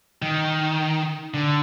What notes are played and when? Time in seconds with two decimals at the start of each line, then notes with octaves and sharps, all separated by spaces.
0.22 D#3
1.34 D3